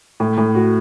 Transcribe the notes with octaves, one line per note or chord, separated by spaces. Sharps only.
A2
A2
F#4